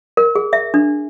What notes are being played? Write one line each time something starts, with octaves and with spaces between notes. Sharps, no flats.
A#4
G#4
E5
D4